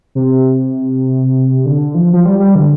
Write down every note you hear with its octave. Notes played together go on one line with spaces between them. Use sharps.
C3
D3
F3
F3
G3
G3
D3